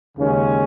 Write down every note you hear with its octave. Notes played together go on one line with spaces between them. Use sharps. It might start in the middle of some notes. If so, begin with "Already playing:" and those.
D#2 C#3 G#3 C#4